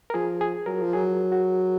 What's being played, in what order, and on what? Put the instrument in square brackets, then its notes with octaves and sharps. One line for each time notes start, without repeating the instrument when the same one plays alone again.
[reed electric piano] A#4
[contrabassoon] F3 [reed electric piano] G#4
[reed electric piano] G#4
[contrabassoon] F#3 [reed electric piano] A#4
[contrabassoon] F3
[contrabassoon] F#3 [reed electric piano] G#4
[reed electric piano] F#4